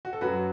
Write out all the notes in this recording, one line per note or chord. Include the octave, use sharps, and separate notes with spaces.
F#4
A4
F#2 F#3 F#4 B4